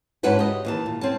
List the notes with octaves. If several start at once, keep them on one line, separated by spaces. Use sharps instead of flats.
G#2 C#4 E4 F#4 B4 A5
G4 D#5
D#2 E3 A5
A#2
C4 C#4 A5